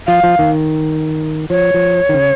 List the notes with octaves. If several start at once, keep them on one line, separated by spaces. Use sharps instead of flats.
F3 F5
F3
D#3
F3 C#5
F3
D#3
C#3